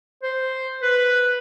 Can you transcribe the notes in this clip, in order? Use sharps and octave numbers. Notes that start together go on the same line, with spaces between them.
C5
B4